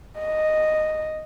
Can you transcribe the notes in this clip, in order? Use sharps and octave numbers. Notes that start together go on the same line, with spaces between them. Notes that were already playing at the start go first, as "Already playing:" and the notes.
D#5